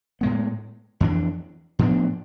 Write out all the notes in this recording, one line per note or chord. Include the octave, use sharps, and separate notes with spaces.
A2 G#3 B3
F2 E3 B3 D4
A2 F3 B3 D4